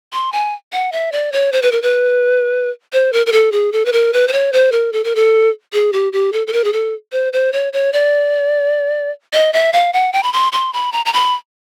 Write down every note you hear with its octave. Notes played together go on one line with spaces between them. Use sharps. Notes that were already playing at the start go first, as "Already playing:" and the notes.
C6
G#5
F#5
E5
D5
C#5
C5
B4
A#4
B4
C5
A#4
A#4
A4
G#4
A4
B4
A#4
B4
C5
C#5
C5
A#4
A4
A#4
A4
G#4
G4
G4
A4
A4
A#4
G#4
A4
C5
C5
C#5
C#5
D5
D#5
E5
F5
F#5
G5
B5
C6
C6
B5
A#5
A#5
B5